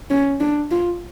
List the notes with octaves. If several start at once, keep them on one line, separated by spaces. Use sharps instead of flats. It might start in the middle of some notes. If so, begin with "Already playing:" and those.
C#4
D4
F4